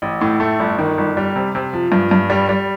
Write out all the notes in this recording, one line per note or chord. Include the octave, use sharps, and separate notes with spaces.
A1
A2
A3
G1
D#3
G1
G3
C3
C3
F3
G2
G2
G3
G3